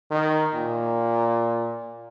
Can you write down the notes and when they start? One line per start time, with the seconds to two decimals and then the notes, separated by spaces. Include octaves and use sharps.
0.11 D#3
0.54 A#2